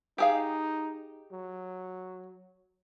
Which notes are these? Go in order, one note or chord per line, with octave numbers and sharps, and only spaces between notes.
D#4 G4 G#4 F5
F#3